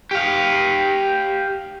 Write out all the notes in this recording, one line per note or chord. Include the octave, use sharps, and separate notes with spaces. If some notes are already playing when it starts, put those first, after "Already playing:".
G4 F5